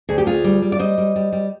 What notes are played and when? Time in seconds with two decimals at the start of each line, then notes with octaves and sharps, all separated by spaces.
0.09 D2 G#4
0.18 G4
0.26 D2 F4 G#4
0.44 G3
0.62 G3
0.72 D5
0.79 G3 C5 D#5
0.98 G3
1.16 G3
1.32 G3